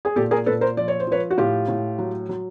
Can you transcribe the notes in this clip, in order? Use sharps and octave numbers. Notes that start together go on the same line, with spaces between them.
G#4
A#2 G4 A4
G#4 A#4
A#2 A4 B4
A#4 C5
F3 D5
C#5
C5
F3 B4 C#5
F#4
A2 F4 G4
A2
F#3
F#3